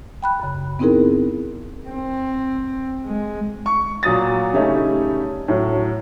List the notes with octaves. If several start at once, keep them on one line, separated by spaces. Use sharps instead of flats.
G5 B5 F#6
F#2 C#3
B3 C4 D#4 E4 G#4 A#4
C4
G#3
C#6
A#2 F#3 D#6 A6
C#3 G3 A3 C#4 D#4
A2 F#3